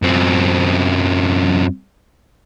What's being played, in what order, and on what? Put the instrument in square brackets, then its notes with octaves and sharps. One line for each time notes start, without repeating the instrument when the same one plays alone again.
[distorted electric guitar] F#2 C4